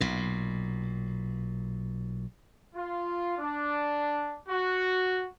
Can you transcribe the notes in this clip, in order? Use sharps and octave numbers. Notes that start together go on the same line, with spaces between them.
B1 A#2
F4
D4
F#4